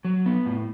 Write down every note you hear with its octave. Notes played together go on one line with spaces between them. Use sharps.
F#3
B3
A2